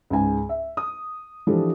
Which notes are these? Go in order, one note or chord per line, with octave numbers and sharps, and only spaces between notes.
C#2 G#2 G#5
E5
D#6
E3 F3 D4 G4 A4